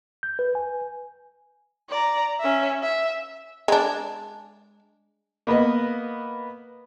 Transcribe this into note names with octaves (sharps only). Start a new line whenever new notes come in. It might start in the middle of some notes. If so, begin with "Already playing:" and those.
G6
B4
G#5
D5 A#5
C#4 E5
E5
G#3 D4
A#3 B3 B4 D#5